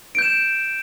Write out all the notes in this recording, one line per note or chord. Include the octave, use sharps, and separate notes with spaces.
G6 D7 E7